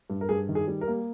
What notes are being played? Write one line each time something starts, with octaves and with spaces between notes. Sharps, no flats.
G2
A#4
G2 G#4
D#3
G#4
G3
A#4
A#3